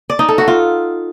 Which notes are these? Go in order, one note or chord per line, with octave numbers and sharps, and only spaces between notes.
D5
D#4
A4
F#4
F4